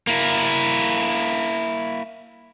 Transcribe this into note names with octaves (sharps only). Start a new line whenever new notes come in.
A#3 E4